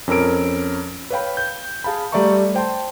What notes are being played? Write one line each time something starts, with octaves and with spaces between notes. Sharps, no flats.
F2 C#4 A#4 E6 D7
B4 C#5 F5 G5 B5
G6
G#4 F5 A5 B5
G3 A3 D5 E5 A#5 C#6
C5 G5 A5 C6